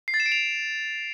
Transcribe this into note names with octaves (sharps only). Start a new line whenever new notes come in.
C7
A6
E7
D7
F7